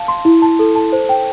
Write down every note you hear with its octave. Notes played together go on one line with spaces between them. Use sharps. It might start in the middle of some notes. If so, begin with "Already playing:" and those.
Already playing: F5 A5
C6
E4
A5
A4
A5
C5
G5